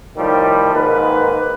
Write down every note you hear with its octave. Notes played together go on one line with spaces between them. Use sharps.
A2 D#3 F3 G3
G#2 D#3 A#3 B4